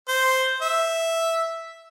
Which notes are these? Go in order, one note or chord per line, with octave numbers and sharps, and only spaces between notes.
C5
E5